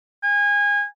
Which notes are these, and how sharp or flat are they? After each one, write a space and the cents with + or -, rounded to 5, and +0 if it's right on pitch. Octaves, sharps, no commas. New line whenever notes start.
G#5 -25